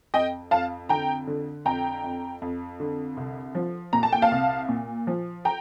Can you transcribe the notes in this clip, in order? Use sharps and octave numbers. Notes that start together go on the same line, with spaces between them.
F2 D#5 G5
F2 F5 A5
D3 G5 A#5
D3
F2 G5 A#5
F2
F2
D3
C2
F3
A#2 A#5
A5
G5
F5 A5
C2
A#2
F3
G5 A#5